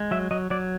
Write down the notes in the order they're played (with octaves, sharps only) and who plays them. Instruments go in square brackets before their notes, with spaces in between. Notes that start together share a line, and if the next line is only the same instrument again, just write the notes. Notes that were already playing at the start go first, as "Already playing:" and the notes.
Already playing: [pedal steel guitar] G#3
F#3 E5
F#3 D#5
F#3 D5